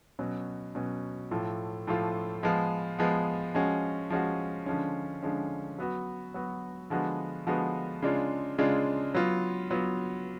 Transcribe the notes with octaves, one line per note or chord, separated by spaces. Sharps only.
B2 F#3 C#4
B2 F#3 C#4
A2 F3 A3 F4
A2 F3 A3 F4
F3 G#3 B3
F3 G#3 B3
F3 G#3 C#4 F#4
F3 G#3 C#4 F#4
D3 F3 G#3 C#4
D3 F3 G#3 C#4
F#3 B3 F#4
F#3 B3 F#4
D3 F3 G#3 B3 F#4
D3 F3 G#3 B3 F#4
C#3 G#3 D4 F4
C#3 G#3 D4 F4
F#3 B3 F4
F#3 B3 F4